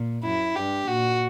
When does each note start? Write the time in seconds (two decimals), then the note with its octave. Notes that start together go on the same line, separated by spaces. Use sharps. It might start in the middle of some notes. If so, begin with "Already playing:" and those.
Already playing: A#2
0.24 F#2 E4
0.55 G2 G4
0.87 A#2 F#4